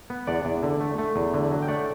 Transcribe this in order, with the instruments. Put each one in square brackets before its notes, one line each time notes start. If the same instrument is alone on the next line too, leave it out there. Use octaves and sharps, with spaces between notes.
[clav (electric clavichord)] B3
E2 D5 F#5
E2
D3
A3
A3
E2
D3
F#3
G5
A3 D5 F#5